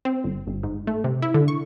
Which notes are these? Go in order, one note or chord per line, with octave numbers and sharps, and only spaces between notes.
C4
G1
G1
G#2
A3
C3
E4
D3
C#6